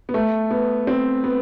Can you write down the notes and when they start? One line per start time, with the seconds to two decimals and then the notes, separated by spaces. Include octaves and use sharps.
0.09 B3
0.14 A3
0.51 B3
0.87 C4
1.24 B3